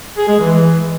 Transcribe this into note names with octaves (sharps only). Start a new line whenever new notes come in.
G#4
G#3
E3